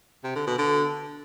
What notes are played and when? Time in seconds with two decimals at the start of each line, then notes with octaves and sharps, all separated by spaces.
0.24 C3
0.35 D3
0.47 B2
0.58 D3